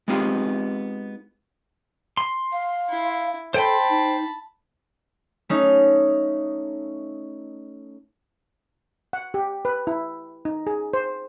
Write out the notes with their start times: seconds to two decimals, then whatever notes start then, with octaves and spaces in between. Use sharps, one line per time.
0.08 G#3 B3 C4 D#4 F4 G4
2.17 C6
2.52 F5
2.89 E4
3.54 A4 C5 G5 A5 B5 C6
3.90 D#4
5.49 A3 C#4 D#4
9.13 F#5
9.34 G4
9.65 B4
9.87 E4
10.45 D#4
10.67 G#4
10.94 C5